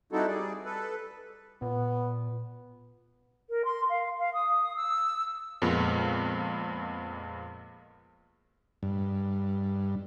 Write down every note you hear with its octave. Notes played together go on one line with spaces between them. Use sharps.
G3 C4 D#4 E4 F#4 A4
G3 G#4 D5
A4 B4
A#2 B3
A#4
C6
F5
F5
D#6
E6
F2 A#2 G#3 B3
G2